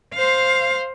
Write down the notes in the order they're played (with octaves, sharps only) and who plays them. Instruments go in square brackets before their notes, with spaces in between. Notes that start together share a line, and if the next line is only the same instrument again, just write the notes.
[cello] C5 F5